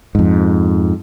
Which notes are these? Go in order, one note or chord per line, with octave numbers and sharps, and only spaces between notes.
F2 G#2